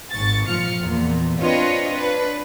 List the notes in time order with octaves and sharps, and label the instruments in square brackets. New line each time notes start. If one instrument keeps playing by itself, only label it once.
[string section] G#1 C#6 A6
A#2 F3 F4 F6 C#7
E2 A#2
C4 D4 F4 B4 C#5 D#5
D4 B4